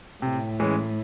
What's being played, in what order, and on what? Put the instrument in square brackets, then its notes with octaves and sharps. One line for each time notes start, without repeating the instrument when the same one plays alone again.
[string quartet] A2 [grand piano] C3
[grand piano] E3 G#3 C#4